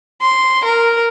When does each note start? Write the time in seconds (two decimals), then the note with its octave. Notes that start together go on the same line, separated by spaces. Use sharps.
0.21 C6
0.64 A#4